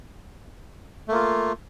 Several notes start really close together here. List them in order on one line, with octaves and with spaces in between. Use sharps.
A3 A#3 F4